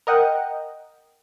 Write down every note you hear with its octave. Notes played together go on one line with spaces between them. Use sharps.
A#4 D#5 F#5 G5